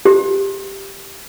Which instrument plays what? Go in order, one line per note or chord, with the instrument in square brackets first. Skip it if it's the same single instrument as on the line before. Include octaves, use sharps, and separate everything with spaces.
[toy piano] G4